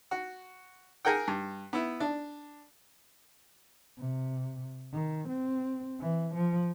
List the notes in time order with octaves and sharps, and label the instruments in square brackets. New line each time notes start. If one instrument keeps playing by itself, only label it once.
[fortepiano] F#4
G#4 A#4 F#5 G5
G2
B3 E4
D4
[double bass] C3
D#3
C4
E3
F3